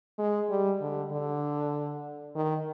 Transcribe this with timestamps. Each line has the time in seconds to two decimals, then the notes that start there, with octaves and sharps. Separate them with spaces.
0.18 G#3
0.50 G3
0.80 D3
1.12 D3
2.35 D#3